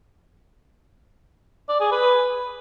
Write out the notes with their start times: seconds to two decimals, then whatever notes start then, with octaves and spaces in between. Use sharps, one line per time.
1.69 D5
1.80 G#4
1.92 B4